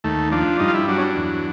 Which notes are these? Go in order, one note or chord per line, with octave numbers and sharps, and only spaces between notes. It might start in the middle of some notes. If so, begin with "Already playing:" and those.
D#2 A3
F3 D4
G2 D#4
F4
E4
F#3 D4
C#4
D4
E2